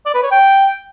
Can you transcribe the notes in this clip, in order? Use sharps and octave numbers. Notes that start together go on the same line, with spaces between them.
D5
B4
C#5
G5